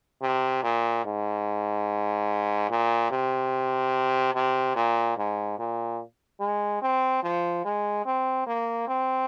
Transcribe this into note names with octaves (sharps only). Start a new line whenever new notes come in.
C3
A#2
G#2
A#2
C3
C3
A#2
G#2
A#2
G#3
C4
F3
G#3
C4
A#3
C4